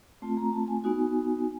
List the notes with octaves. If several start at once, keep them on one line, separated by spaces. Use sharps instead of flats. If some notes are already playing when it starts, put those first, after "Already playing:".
A3 C4 F4 A5
A#5
A5
G#5
B3 D#4 F#4